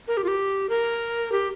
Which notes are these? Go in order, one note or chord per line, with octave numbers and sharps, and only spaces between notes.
A#4
G4
F4
G4
A#4
G4